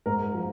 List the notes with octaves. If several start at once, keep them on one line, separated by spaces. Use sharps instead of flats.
G#2 A#4
F3